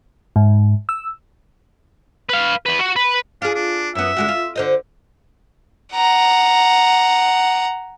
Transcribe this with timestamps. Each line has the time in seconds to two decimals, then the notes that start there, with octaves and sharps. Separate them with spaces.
0.36 G#2
0.89 E6
2.29 B4 F5
2.66 E2 B4
2.79 F#4
2.96 B4
3.42 D4 F4 G#4
3.55 D4
3.95 F#2 B3 E5
4.17 D3 G#3 F#4
4.28 F4
4.56 D3 C5 D#5
5.94 F#5 A#5